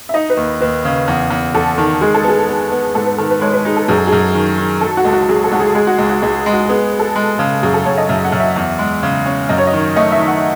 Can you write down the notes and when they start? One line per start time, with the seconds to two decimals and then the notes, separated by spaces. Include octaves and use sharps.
0.09 E5
0.14 D#4 D#5
0.30 B4
0.37 D#2
0.61 D#2 B4
0.85 C#3
1.08 E2
1.31 E2
1.55 E2 A4
1.78 D#3
2.01 G#3 G#4
2.14 A4
2.24 B3 G#4
2.49 B3
2.72 B3
2.94 G#2 A4
3.06 B4
3.18 D#3 A4
3.30 B4
3.41 G#3 C#5
3.53 B4
3.65 D#4 G#4
3.77 A4
3.88 F#2 G#4
3.98 A4
4.07 G#4
4.12 F#2
4.35 D#3
4.58 D#3
4.81 F#3 A4
4.97 F#4
5.05 C#2
5.13 F#4
5.29 F#3 G#4
5.44 A4
5.51 C#2 F#4
5.60 G#4
5.75 G#3 G#4
5.87 F#4
5.98 C#2
6.09 F#4
6.22 C#2 G#4
6.46 G#3
6.53 F#4
6.69 B3 G#4
6.93 B3
6.99 A4
7.16 G#3
7.39 C#3
7.63 F#2 G#4
7.74 A4
7.85 F#2 C#5
7.98 D#5
8.09 F#2 E5
8.24 F#5
8.32 F#2
8.40 E5
8.56 E2
8.79 G#3
9.03 C#3
9.26 C#4
9.49 F#2 D#5
9.58 C#5
9.67 D#5
9.73 D#3
9.96 A3 D#5
10.12 E5
10.20 D#3
10.28 F#5